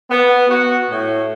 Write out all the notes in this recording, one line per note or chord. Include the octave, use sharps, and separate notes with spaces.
B3
F#4
A2